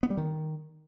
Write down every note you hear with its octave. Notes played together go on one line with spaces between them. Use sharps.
B3
G3
D#3